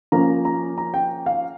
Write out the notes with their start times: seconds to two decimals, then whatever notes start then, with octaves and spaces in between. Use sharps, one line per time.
0.12 F3 A#3 C#4 A#5
0.45 A#5
0.78 A#5
0.94 G5
1.26 F5